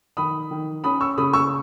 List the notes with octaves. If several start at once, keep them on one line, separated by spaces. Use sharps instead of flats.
D#3 B5 D#6
D#3
C#4 B5 D#6
C#6 E6
C#3 B5 D#6
C#6 E6